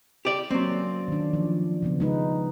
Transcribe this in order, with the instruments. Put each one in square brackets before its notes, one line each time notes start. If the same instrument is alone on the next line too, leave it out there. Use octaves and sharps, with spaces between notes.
[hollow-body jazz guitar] G4 D5
[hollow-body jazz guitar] F#3 C4 [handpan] A#3 C#4 D5
[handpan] D#3 D4
F3
C#3 F3 B3
G#3 D#4 B4